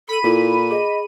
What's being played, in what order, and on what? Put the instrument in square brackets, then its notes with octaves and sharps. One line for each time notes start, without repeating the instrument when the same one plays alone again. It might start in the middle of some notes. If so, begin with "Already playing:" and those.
[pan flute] A4 [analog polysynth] B5 D#7
[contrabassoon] A#2 [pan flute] E4 [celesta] F4 A4
[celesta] G#4 [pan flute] D#5